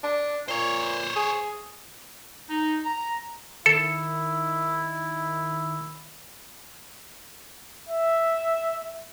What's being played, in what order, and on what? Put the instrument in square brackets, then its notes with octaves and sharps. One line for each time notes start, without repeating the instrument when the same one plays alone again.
[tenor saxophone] D4
[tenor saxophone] A#2 [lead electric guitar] C5 C#5
[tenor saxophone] G#4
[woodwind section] D#4
A#5
[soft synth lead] D#3 [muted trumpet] E4 [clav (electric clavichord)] A4
[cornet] E5